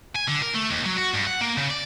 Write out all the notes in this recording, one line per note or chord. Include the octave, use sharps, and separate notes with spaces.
G#5
D3
A#4
A3
D#2
F#3
F#4
G2
F#5
A#3
C#3
D5